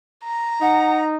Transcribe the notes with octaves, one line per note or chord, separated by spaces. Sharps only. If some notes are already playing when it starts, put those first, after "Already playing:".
A#5
D#4 F#5